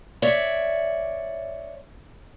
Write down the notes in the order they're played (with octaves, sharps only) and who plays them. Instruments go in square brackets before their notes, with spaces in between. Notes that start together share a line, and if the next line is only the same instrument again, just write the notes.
[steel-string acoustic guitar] C#5 D5 E5